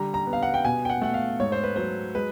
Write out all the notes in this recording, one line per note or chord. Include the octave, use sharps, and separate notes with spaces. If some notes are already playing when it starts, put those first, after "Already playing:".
Already playing: D3 G3 A#5
A#5
B3
F5
F#5
G5
B2 G#5
G5
F#5
A3 F#5
F5
G#2 C#5
C5
B4
F#3 C5
G#3 B4